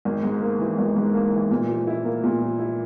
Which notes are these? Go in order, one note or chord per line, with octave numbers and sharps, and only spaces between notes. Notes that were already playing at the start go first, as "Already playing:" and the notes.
G#1
G#2
A#3
E3
G#1
G#2
A#3
E3
A#2
F3
E4
A#3
A#2
F3
E4